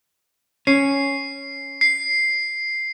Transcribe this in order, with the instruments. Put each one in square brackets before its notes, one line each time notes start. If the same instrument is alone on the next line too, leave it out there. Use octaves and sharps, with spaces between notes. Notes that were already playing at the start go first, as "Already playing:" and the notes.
[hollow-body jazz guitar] C#4 [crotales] C7
[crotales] C7